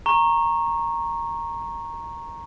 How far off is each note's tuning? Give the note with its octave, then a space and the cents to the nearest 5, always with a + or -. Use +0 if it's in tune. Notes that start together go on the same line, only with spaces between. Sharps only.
A#5 +0 C#6 -20